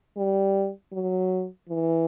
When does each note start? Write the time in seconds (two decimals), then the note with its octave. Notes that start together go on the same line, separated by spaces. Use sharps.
0.17 G3
0.92 F#3
1.69 E3